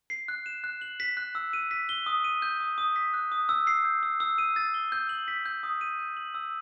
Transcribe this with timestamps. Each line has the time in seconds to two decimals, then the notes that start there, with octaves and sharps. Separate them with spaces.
0.10 C7
0.28 F#6
0.46 E7
0.64 F#6
0.82 F#7
1.00 B6
1.17 F#6
1.35 E6
1.53 D#7
1.71 B6
1.89 G7
2.06 D#6
2.24 D#7
2.42 G6
2.60 D#6
2.78 D#6
2.96 B6
3.14 F#6
3.32 D#6
3.49 E6
3.67 C7
3.85 G6
4.03 E6
4.20 E6
4.38 D#7
4.56 A6
4.74 G7
4.92 G6
5.09 F#7
5.28 B6
5.46 G6
5.63 D#6
5.81 D#7
5.99 G6
6.17 F#7
6.35 E6